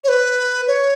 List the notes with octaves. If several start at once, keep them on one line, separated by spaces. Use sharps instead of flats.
C#5
B4
C#5